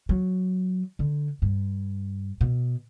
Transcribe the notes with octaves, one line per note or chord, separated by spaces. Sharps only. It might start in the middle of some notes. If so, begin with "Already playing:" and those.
F#3
D3
G2
B2